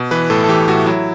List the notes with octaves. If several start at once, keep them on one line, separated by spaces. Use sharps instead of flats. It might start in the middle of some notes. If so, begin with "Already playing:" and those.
Already playing: B2
E3 B4
A2 A4
A4
E3 G4
A2 F#4
F#3 E4